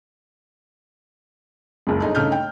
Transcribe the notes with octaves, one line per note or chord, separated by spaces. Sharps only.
F#1 C#2
G1 D#4 G#4
G1 C#3 A3 D#4 F6 G6
G5